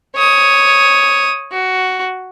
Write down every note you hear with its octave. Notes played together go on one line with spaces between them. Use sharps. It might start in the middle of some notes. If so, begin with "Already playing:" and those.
C#5 D#6
F#4